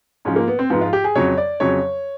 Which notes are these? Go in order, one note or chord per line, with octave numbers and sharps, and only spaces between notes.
G#2 F3 C#4
A#3
B3
C4
G#2 F3 B3
F4
G4
G#4
F2 C#3 F#3 C#5
D5
F2 C#3 F#3 C#5